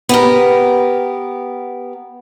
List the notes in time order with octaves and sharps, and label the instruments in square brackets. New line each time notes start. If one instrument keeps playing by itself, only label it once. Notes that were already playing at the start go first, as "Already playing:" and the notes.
[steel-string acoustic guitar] B3 G4 A#4